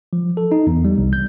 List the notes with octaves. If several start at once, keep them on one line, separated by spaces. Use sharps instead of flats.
F3
A4
D#4
E2
G3
C2
G6